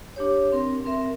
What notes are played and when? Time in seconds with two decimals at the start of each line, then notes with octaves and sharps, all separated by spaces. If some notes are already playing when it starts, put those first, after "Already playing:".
0.16 D4 G4 C#5
0.52 C4 A#4
0.85 C4 A#4 E5